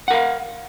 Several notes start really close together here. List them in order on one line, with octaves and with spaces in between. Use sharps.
F#5 A#4 F5